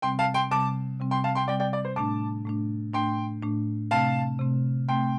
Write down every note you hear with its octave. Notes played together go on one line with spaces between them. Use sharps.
C3 G3 C4 G5 C6
F5 A5
G5 C6
C3 G3 C4 A5 D6
C3 G3 C4
G5 C6
F5 A5
G5 C6
C3 G3 C4 D5 G5
D5 G5
D5
C5
A2 A3 D4 A5 D6
A2 A3 D4
A2 A3 D4 G5 C6
A2 A3 D4
C3 A3 C4 F5 A5
C3 A3 C4
C3 A3 C4 G5 C6